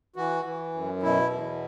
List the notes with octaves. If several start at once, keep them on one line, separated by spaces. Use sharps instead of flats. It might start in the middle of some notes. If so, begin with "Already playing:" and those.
E3 F#4
E3
F#2
B2 E4
E2